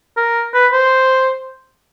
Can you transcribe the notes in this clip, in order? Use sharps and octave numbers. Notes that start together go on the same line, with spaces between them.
A#4
B4
C5